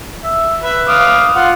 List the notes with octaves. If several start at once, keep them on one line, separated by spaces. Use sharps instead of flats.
E5
B4 E5
F5 D6 D#6
F4 F#5